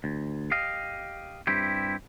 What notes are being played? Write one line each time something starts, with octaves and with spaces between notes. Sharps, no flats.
D2
G4 D#5 F5
G2 C4 E4 G4